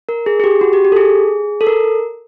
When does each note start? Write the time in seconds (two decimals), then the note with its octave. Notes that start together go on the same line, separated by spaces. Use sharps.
0.09 A#4
0.26 G#4
0.40 G#4
0.44 G4
0.61 F#4
0.73 G4
0.85 G4
0.92 A4
0.96 G#4
1.61 A4
1.67 A#4